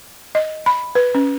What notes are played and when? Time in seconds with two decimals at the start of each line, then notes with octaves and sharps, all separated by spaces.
0.35 D#5
0.66 B5
0.95 B4
1.15 C#4